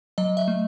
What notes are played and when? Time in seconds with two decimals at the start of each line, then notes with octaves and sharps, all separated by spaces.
0.18 F#3 D#5
0.37 E5
0.48 A3